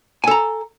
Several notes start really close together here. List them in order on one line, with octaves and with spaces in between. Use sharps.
G#5 A4 A#5